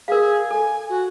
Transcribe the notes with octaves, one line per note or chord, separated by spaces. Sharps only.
G#4 A#4 F5
A4 G#5
F#4